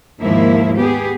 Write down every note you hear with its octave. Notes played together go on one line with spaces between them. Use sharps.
D#2 G#2 F3 A#3 E4
B3 G4 G#4